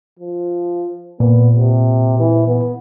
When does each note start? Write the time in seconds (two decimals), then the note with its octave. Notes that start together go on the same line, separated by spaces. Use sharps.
0.19 F3
1.20 A#2 B3
1.56 C3
2.19 E3
2.47 B3